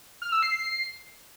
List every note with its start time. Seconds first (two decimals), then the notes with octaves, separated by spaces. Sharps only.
0.22 F6
0.32 E6
0.43 C7